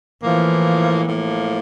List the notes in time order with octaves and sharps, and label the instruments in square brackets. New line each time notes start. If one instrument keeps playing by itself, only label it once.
[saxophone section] A2 F3 A#3 [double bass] E3
[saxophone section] A2 F3 A#3